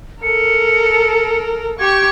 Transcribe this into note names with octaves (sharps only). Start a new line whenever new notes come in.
A4 A#4 C#7
G4 C#6 G#6